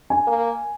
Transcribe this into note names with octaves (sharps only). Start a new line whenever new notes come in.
G#5
A#3